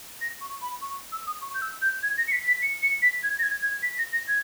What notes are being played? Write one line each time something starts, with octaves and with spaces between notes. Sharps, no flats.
A#6
C#6
B5
C#6
E6
D#6
C#6
G6
E6
G6
G#6
A#6
C#7
B6
B6
C#7
C#7
B6
G#6
A#6
G#6
G#6
B6
A#6
A#6
G#6